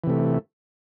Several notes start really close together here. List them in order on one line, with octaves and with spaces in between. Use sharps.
E3 C3 A3